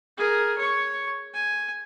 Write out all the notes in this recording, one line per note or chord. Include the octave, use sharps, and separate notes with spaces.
G#4 A#4
C#5 C#6
G#5